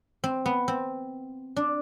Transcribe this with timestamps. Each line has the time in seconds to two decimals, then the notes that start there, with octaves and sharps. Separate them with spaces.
0.24 C4
0.46 B3
0.68 C4
1.56 D4